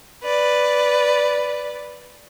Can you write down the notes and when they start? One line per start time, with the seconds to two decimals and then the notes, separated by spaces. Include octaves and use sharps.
0.23 B4 D5